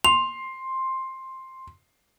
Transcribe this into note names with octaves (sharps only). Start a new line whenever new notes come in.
C6 F7